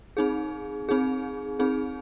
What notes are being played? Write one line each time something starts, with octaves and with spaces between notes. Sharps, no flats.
C4 D#4 G#4
C4 D#4 G#4
C4 D#4 G#4